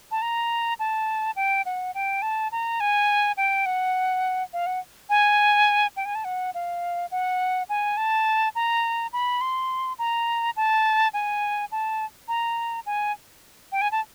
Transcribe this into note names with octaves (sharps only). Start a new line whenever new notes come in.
A5
A#5
A5
G5
F#5
G5
A5
A#5
G#5
G5
F#5
F5
F#5
G#5
G5
G#5
A5
F#5
F5
F#5
G#5
A5
A#5
B5
C6
A#5
A5
G#5
A5
A#5
G#5
G5
G#5
A5